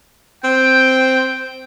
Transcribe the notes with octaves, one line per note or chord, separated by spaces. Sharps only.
C4 G5